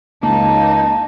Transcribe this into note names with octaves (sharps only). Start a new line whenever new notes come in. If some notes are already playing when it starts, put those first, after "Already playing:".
C#2 A#3 D#4 A5